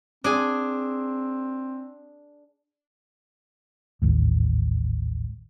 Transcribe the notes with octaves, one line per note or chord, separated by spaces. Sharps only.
C4 D4 G#4 G#5
A1 D#2 G#2